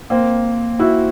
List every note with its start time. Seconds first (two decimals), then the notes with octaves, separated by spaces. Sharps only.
0.10 A#3 C4
0.79 E4 F#4